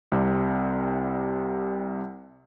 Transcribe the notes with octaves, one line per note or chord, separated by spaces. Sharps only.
C2 C3 G3